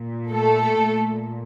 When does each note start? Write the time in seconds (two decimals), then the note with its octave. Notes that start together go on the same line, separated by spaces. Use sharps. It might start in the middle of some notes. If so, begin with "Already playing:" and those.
Already playing: A#2
0.31 A3 A4
0.77 A#2